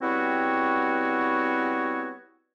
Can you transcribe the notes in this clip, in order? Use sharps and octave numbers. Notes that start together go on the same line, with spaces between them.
G3 B3 C4 E4 F#4 C#5